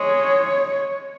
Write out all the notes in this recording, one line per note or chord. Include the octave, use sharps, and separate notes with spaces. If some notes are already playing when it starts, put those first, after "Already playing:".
Already playing: G#3 C#5